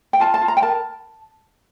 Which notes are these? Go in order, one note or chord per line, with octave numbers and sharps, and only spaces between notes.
G5
F4 A5
A5
F4
A#5
G5
A#4 A5